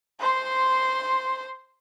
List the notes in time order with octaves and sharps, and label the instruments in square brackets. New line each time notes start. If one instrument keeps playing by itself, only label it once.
[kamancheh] C5 C6